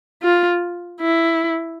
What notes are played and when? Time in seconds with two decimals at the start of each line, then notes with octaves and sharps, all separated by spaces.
0.23 F4
1.01 E4